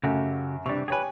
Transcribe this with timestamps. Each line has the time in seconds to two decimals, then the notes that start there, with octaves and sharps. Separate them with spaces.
0.03 F#2 C#3 A3 F#4 G4
0.66 C3 E3 G3 D4 C#6
0.88 G4 G#4 B4 C#5 G#5